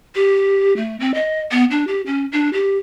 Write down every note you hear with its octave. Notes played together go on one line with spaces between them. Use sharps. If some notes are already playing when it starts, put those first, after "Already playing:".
G4
A3
C4
D#5
B3
D4
G4
C#4
D4
G4